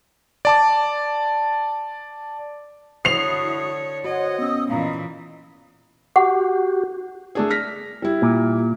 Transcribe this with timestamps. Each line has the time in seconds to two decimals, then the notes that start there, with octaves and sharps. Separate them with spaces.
0.45 D5 A5 D6
3.05 D3 E4 F#4 C#5 D#6 C7 F7
4.04 F#4 C5 C#5 D#5 F#5
4.39 B3 C#4 D#6 E6
4.68 A#2 E3 D#5 F5 A#5
6.16 F#4 G4 F#5
7.35 A3 D4 G#4
7.50 F6 A#6 B6
8.02 G3 E4
8.22 A#2